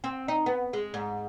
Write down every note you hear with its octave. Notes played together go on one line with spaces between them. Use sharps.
C4
D#4
B3
G#3
G#2